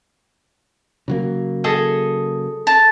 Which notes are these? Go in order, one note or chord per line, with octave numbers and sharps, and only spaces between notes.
C#3 F#3 A#3
G#4 A4 D#5
A5